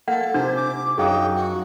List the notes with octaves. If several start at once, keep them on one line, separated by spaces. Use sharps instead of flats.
A#3 A4 F#5
C3 D4 C5
D6
F#2 F#3 D#4 G#4 F5 G5 D#6
F#4